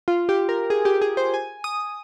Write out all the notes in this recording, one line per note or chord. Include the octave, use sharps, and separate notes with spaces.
F4
G4
A#4
G#4
G4
G#4
C5
G#5
D#6